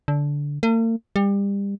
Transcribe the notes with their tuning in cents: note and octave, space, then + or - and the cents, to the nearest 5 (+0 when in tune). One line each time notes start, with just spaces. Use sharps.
D3 -15
A#3 -45
G3 +30